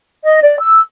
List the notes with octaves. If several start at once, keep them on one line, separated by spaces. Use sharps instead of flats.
D#5
D5
E6